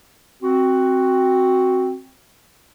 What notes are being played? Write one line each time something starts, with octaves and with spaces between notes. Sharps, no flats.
C4 F#4